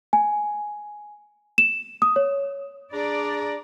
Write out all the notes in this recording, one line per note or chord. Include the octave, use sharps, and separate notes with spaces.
G#5
E7
D#6
C#5
D4 G#4 D5 A#5